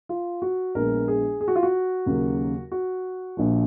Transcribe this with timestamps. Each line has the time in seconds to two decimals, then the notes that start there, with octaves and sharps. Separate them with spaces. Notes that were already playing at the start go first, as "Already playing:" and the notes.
0.09 F4
0.42 F#4
0.75 A#1 A#2 G#3 B3 A#4
1.08 G#4
1.41 G#4
1.48 F#4
1.56 F4
1.63 F#4
2.06 D#2 C#3 F#3 A#3
2.72 F#4
3.37 A#1 A#2 F3